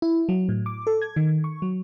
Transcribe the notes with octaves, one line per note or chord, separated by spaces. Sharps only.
E4
F#3
A2
D6
A4
G#6
D#3
C#6
F#3